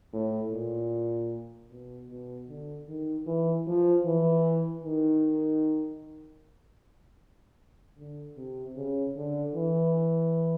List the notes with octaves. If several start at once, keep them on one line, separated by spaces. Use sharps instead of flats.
A2
A#2
B2
B2
D3
D#3
E3
F3
E3
D#3
D3
C3
C#3
D3
E3